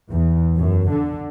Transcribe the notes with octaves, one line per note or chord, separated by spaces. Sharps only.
E2
F#2
D3